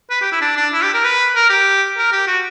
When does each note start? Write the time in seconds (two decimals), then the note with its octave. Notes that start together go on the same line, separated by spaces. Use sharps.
0.10 B4
0.21 G4
0.32 E4
0.41 D4
0.57 D4
0.73 E4
0.83 G4
0.94 A#4
1.04 B4
1.35 A#4
1.50 G4
1.97 A#4
2.12 G4
2.27 F#4